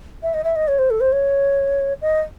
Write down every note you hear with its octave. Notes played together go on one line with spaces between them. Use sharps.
E5
D#5
E5
D#5
C#5
C5
A4
C5
C#5
D#5